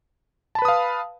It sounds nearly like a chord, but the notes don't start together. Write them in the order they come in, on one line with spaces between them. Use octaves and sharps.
A5 B5 B4 D#6 F5